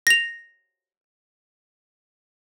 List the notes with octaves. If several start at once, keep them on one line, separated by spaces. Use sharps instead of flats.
A#6 F7